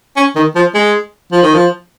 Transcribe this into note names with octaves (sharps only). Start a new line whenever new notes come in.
C#4
D#3
F3
G#3
F3
D#3
F3